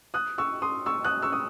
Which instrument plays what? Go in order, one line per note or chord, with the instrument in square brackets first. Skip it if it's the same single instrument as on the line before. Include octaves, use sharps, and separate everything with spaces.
[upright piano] D#6 F#6
C#6 E6
C6 D#6
C#6 E6
D#6 F#6
C#6 E6
D#6